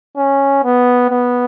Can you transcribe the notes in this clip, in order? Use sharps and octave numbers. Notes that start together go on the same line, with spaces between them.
C#4
B3
B3